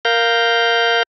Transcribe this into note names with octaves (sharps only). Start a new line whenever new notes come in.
A#4 F5 G6